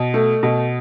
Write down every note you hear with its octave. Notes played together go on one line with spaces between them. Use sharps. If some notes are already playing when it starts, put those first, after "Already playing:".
Already playing: B2
A3
B2